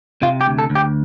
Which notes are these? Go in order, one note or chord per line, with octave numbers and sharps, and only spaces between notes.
C3 F4
G4
D2
A4
D2
G4